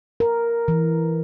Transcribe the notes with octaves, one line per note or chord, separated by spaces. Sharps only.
A#4
E3